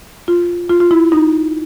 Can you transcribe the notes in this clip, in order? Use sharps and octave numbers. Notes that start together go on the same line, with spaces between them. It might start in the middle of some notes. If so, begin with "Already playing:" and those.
F4
F4
F4
E4
D#4